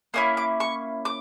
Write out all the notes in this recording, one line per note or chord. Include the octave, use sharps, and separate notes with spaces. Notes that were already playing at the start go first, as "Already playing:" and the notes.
A#3 C#4 E4 D#6
D6
C#6
D6